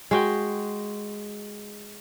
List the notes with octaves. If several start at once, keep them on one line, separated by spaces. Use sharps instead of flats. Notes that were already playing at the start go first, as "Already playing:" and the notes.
G#3 F#4 G5